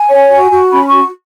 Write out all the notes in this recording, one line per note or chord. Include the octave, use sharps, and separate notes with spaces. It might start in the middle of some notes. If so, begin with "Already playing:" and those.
Already playing: G#5
C#5
F#4
F#4
C#4 B5
C#6
F#4